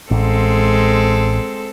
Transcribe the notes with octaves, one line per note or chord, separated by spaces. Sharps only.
A1 G#3 C4 A4